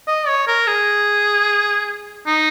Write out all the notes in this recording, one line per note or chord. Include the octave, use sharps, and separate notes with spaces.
D#5
C#5
A#4
G#4
D#4